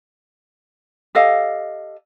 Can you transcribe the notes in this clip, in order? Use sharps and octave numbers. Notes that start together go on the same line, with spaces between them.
G4 A4 D#5 F5